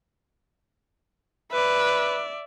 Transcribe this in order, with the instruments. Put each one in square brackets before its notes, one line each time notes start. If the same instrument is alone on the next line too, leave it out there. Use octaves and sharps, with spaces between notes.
[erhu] B4 [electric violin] D5 E5